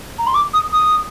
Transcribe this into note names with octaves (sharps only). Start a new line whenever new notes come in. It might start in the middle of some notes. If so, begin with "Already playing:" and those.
A#5
C6
D6
D#6
D#6